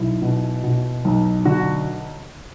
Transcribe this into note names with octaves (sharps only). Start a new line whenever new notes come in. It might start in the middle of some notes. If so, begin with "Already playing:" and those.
Already playing: B1 E4
B2
B2
B1
D3 F#4